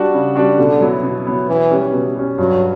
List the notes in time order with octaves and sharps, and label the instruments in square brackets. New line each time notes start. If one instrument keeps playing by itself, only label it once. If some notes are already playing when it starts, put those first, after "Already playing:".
Already playing: [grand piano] G3 D4 F#4
C#3
G3 D4 F#4
[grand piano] B2 [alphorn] D3
[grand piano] F#3 B3 E4
B2
F#3 B3 E4
[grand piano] B2 [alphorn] E3
[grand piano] G3 C#4
B2
G3 C#4
[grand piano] G2 [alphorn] F#3